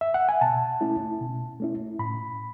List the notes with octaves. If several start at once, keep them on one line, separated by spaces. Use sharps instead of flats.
E5
F#5
G#5
B2 A5
A3 C#4 E4
B2
A3 C#4 E4
A2 B5